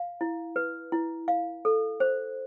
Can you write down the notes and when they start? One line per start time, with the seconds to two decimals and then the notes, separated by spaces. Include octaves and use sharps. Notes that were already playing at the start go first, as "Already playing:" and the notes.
Already playing: F5
0.21 E4
0.56 B4
0.92 E4
1.28 F5
1.65 A4
2.00 C5